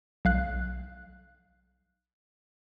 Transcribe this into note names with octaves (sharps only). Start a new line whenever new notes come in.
B1 F5 F#6